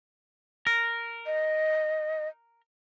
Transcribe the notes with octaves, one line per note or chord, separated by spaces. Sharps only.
A#4
D#5